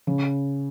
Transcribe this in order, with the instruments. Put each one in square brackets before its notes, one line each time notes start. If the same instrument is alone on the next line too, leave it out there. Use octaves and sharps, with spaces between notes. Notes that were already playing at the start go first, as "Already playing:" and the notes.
[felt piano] C#3